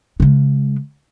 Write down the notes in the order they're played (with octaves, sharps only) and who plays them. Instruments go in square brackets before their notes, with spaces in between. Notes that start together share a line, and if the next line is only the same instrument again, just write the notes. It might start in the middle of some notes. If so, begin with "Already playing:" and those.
[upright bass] C#3 G#3